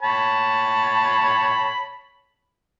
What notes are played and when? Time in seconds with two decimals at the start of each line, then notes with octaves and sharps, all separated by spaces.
0.02 C#5 A5 B5